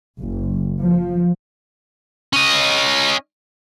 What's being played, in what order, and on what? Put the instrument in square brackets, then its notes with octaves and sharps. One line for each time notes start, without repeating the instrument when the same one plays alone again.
[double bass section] F#1
F3
[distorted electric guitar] C#4 D#5